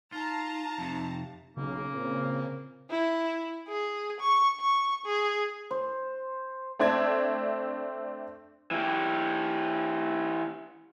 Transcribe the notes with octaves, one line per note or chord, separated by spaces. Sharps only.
D#4 F4 A5 A#5
F2 C3
B1 C#3 A#3
A#2 C4 A#4
E4
G#4
C#6
C#6
G#4
C5
A3 C4 D4 E5 G#6
E3 G4